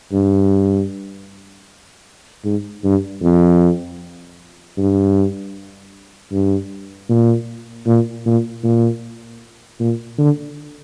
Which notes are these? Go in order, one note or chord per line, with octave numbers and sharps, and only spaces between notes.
G2
G#2
G2
F2
G2
G2
A#2
A#2
A#2
A#2
A#2
D3